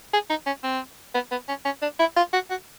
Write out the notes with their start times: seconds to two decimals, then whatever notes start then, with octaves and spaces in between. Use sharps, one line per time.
0.13 G#4
0.30 D#4
0.46 C#4
0.64 C4
1.14 B3
1.31 B3
1.48 C#4
1.65 C#4
1.82 D4
1.99 E4
2.16 F4
2.33 F#4
2.50 F#4